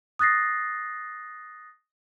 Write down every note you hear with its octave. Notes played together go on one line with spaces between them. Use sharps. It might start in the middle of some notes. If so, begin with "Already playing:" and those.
D#6 F#6 A6 A#6 C7